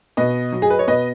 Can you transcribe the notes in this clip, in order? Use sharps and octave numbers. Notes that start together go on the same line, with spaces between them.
B2 B4 D#5
F#3
G#4
B4
C#5
B2 B4 D#5